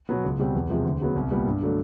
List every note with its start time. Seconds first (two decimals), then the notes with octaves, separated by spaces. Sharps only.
0.09 B2 F#3 B3
0.24 C#2
0.39 B2 G3 C4
0.55 E2
0.69 C3 F3 G#3
0.85 D2
1.00 C#3 F#3 B3
1.16 C2
1.31 A#2 G3 B3
1.46 G2
1.61 D3 F#3 A3 D4